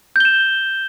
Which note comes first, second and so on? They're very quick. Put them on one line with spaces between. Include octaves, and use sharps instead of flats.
G6 G7 E7